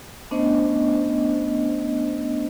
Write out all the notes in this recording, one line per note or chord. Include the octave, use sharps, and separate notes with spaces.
A3 B3 C#4 D4 C5 D#5